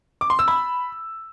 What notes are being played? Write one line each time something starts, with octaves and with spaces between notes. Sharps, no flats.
D6
C6
E6
B5